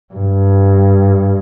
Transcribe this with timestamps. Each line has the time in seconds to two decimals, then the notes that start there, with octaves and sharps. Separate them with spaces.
0.14 G2